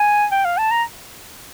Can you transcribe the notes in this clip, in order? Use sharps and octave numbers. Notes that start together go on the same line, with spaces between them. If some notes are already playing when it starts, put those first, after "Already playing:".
Already playing: G#5
G5
F5
A5
A#5